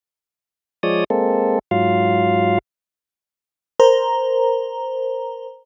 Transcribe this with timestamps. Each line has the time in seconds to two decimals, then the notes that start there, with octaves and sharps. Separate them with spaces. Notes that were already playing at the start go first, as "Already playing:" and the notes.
0.83 F3 G#3 C#5 D5 D#6
1.10 G#3 A#3 C4 A4
1.71 G#2 F#3 F4 F5
3.80 A#4 C5 A#5